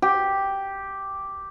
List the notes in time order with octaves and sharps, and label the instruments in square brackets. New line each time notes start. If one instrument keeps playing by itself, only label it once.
[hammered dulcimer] G4